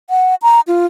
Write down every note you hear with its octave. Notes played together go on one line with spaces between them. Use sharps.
F#5
A#5
F4